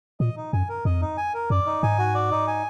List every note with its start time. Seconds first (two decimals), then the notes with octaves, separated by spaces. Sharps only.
0.20 A#2 D#5
0.36 D#4
0.53 F#2 G#5
0.69 A#4
0.85 F2 D#5
1.01 D#4
1.17 G#5
1.34 A#4
1.50 F#2 D5
1.66 D#4
1.83 G#2 G#5
1.98 F#4
2.15 D5
2.31 D#4
2.47 G#5